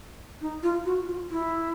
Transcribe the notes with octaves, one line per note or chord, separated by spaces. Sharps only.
D#4
F4
F#4
F4
E4